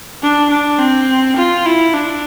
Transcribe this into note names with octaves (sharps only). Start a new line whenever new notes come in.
D4
D4
C4
F4
E4
D4